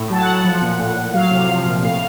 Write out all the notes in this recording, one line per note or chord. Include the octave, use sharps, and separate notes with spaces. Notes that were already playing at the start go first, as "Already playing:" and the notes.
Already playing: A2
F#3 A5
F#5
A2
F#5
F3
A#2
A2
A2
F#3 F5
C3 F5
F3
A#2
A2 F5